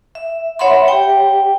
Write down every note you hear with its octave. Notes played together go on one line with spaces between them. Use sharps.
E5
C#5 E5 F#5 B5 C6
G4 G5